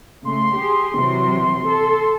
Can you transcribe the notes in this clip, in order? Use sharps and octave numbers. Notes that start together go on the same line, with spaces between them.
C#3 A3 C6
G4 G#4
C3 E3 F#3
A4